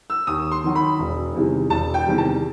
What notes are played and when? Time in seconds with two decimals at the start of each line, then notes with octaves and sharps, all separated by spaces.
0.10 E6
0.27 D#2 D#6
0.51 C6
0.64 D#3 F#3
0.75 B5
0.99 E1
1.35 E2 C3 D#3 G3
1.70 E1 A5
1.94 G5
2.06 E2 C3 D#3 G3
2.18 A5